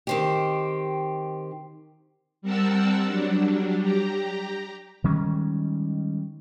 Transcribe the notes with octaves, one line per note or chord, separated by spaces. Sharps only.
D#3 C4 G4
G3 C4 A#4 F#5 A5 E6
F#3 G3 D4
G4 A#5
D#3 G3 G#3 C#4